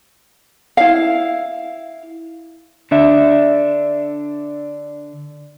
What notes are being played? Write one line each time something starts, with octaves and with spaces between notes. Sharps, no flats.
E4 F5
D3 D4 E5